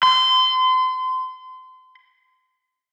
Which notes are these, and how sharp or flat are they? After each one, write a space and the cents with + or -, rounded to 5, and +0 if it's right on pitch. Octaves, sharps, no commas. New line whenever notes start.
C6 -30